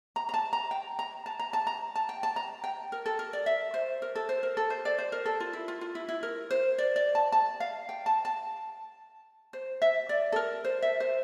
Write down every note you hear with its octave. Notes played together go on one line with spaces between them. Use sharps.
A#5
A#5
A5
A#5
G5
A#5
A5
A#5
A5
A#5
A5
G5
A5
A#5
G5
A#4
A4
A#4
D5
E5
C5
A#4
A4
C5
A#4
A4
C5
D5
C5
A#4
A4
F4
E4
F4
F4
E4
E4
A#4
C5
D5
D5
A5
A5
F5
G5
A5
A5
C5
E5
D5
A4
A#4
C5
E5
C5